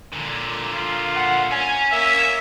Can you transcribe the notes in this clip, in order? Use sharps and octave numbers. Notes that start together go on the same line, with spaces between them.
A#2 D3
F4
F#5
C#4 G#5
A#3 E5